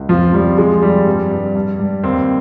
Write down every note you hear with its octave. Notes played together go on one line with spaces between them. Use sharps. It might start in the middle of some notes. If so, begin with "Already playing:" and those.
Already playing: C#2
F2 F3
F2 G3
F3 G#3
F2 G3
G2
G2
G2
G2
D#2 C4